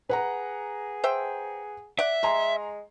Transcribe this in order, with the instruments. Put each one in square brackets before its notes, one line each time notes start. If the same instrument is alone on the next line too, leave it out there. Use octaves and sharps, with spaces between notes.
[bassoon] G#4 [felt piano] B4 F#5 A#5
[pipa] C5 E5 G5
[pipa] D5 F#5 [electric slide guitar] E5
[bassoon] G#3 [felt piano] G#5 A#5 C6